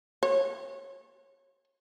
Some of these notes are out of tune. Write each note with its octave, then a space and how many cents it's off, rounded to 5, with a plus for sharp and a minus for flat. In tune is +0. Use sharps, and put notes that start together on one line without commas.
C#5 -20